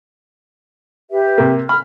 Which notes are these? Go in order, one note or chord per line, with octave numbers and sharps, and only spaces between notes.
G4 B4 E5
C3 A#3
B5 F6